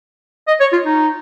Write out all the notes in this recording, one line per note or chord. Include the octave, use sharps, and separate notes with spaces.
D#5
C#5
F4
D#4